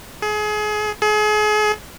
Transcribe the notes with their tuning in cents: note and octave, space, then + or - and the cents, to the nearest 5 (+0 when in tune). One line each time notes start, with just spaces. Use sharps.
G#4 +30
G#4 +35